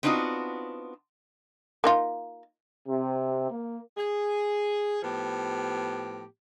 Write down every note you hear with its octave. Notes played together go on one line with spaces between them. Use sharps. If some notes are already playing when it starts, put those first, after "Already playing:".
B3 C4 D4 D#4 F4 F#4
A#3 D#4 F4
C3
A#3
G#4
A2 F3 B3 G4